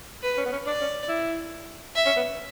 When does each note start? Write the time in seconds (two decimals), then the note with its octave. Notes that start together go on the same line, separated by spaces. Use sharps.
0.23 B4
0.37 C#4
0.46 B3
0.52 C#4
0.66 D4 D5
0.81 C#4
1.09 E4
1.95 E5
2.06 C#4
2.16 B3